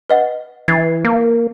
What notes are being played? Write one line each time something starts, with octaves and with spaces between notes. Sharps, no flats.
B4 D#5 F#5
E3 G#6 A6 C7
A#3